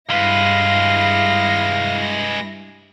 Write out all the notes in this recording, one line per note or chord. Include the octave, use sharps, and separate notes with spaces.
G2 G#3 E4 B4 F5 A#6